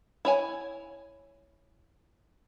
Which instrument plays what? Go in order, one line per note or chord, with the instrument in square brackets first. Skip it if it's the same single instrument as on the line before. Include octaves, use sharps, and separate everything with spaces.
[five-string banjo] E4 C#5 G#5